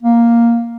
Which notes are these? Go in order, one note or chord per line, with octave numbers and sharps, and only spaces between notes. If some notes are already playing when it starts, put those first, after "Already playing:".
A#3